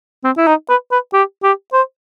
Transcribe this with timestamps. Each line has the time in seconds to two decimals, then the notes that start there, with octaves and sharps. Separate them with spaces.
0.24 C4
0.37 E4
0.47 D#4
0.69 B4
0.91 B4
1.13 G4
1.43 G4
1.73 C5